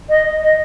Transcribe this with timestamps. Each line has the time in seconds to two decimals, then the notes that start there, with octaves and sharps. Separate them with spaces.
0.09 D#5
0.42 D#5